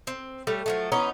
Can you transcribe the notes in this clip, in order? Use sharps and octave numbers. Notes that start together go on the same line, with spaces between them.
C4
G3 A3 G4 C#5
F3 F#3 A3
E3 B3 C#4 D#4